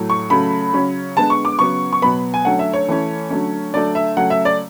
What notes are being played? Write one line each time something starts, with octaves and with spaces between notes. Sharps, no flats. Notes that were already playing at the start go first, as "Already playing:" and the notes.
Already playing: A2 F#3 A3
C#6
C#3 F#3 A3 B5
C#3 F#3 C#4
D3 G#3 B3 A5
C#6
D6
C#3 F#3 B3 C#6
C#6
B2 F#3 B3 B5
G#5
D3 F#3 A3 C#4 F#5
E5
C#5
E3 A3 C#4
D3 F#3 A3 C#4
D3 F#3 A3 D5
E5
C#3 F#3 A3 F#5
E5
D5